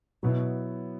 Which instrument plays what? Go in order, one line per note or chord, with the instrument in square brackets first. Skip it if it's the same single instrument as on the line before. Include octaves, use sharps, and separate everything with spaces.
[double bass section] B2 [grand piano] F#3 B3 E4